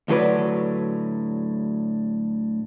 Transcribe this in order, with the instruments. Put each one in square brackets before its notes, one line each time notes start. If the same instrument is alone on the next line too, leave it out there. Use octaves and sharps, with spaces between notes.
[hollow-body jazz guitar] D2 A2 F#3 B4 D5